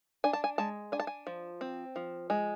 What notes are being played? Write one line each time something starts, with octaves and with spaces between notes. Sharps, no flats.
D4 G#5
A5
G#5
G#3 A5
D4 G#5
A5
G#5
F3
C4
F3
G#3